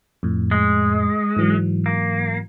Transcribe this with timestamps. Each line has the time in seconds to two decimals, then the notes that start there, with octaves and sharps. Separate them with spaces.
0.23 F2 A2
0.51 G#3
1.37 G#2 E3 F#3
1.86 A#3